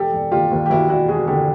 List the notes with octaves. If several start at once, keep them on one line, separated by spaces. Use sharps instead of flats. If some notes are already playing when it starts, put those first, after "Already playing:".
Already playing: E1 G4 A4
E1
D#2 F4 G4
D#2
G4
D#2 E4 F#4
E1 E4 F#4
E1 F#4 G#4
D3 G4 A4